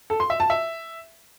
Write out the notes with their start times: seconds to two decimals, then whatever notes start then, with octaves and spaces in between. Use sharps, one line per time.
0.10 A4
0.20 C6
0.30 E5
0.40 A5
0.50 E5